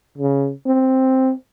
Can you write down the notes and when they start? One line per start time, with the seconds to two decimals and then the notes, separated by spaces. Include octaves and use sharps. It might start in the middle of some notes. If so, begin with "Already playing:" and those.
0.18 C#3
0.66 C4